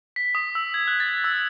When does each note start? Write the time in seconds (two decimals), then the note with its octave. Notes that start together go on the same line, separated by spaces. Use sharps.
0.16 B6
0.35 D#6
0.55 E6
0.74 G#6
0.87 F#6
1.00 A6
1.24 E6